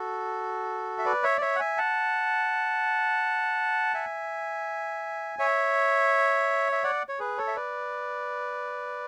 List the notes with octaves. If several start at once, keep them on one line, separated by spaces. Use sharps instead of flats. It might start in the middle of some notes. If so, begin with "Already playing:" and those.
Already playing: F#4 A4
E5
B4 D5
C#5 E5
D5
C#5 E5
F#5
E5 G#5
F#5 A5
E5 G#5
C#5 E5
E5
D5 F#5
C#5
G#4 B4
A4 C#5
E5
B4 D5